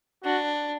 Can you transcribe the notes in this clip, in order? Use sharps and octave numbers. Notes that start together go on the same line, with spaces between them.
D4 F#4